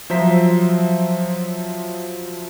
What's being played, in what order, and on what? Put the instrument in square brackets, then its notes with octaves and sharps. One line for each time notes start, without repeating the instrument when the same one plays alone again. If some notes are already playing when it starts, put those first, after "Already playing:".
[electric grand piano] F3 F#3 C5 E5 A#5 B6